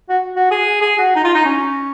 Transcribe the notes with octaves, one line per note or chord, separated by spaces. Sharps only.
F#4
F#4
G#4
G#4
F#4
D#4
F4
D#4
C#4